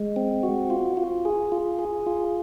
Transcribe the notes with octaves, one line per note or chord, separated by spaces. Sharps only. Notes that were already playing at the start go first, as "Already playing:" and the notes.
Already playing: G#3
C4
F#4
F4
F4
G#4
F4
G#4
F4